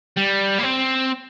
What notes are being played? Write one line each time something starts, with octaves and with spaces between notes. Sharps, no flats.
G3
A#3
C4